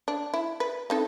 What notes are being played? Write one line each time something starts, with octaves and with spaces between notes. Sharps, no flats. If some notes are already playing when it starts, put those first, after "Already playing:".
D4
E4
B4
C4 D#4 A4